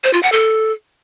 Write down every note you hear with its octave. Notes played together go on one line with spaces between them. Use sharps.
C5
F4
F#5
A4